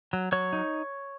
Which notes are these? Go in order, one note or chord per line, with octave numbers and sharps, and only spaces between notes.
F#3
F#3 C#5
D#4